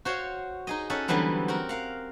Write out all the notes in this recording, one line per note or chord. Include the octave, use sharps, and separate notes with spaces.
F#4 C5 C#5 F5
D#4 G#4 D#5
C#4 D#4 A4 E5 F#5
D3 E3 F#3 G3 B3 C4
C4 F#4 A#4
A#4 F5 F#5